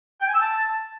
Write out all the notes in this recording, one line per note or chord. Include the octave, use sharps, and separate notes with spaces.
G5
G#5
E6
A5